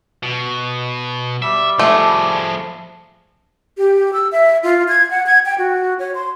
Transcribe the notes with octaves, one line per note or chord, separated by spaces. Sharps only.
B2
G3 E5
F3 A3 G#4
G4
E6
E5
F4
G#6
F#5
G#6
G5
F#4
C#5
C6